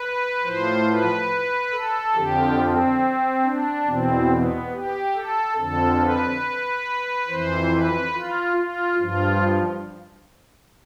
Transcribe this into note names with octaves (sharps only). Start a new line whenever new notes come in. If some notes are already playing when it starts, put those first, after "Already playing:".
Already playing: B4
A2 F3 C5
B4
A4
F2 D3 F3 G4
C4
D4
E2 B2 C4
B3
G4
A4
F2 D3 F3 A4
B4
F2 E3 C5
B4
F4
F4
G2 F3 F4